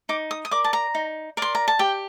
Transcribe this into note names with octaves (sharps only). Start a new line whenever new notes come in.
D#4 D6
D#6
D#6
A#4 D5 D6
A5
A#5
D#4
A#4 D5 C6
A#5
A5
G4 G5